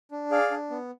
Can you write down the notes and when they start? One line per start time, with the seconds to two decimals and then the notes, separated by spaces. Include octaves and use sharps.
0.11 D4
0.31 G#4 D5 F5
0.51 D4
0.70 B3